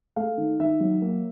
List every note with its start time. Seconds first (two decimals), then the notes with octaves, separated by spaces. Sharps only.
0.16 A3 F5
0.38 D#3
0.60 D#3 E5
0.80 F#3
1.02 A#3